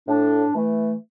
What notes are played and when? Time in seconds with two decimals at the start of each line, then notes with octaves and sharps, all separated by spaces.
0.08 A2 D4
0.55 E3 A3